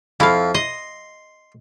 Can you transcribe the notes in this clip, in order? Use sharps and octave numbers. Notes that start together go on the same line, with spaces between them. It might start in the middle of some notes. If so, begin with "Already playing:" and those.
F2 E4 F5
D#5 C6